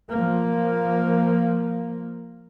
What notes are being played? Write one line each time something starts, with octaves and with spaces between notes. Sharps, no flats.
F3 A#3